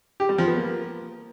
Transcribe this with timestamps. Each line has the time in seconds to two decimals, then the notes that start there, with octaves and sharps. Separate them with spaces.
0.20 G4
0.29 G3
0.38 F3
0.48 B3
0.57 A#3